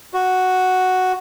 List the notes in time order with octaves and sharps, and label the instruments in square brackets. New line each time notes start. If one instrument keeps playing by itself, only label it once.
[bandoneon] F#4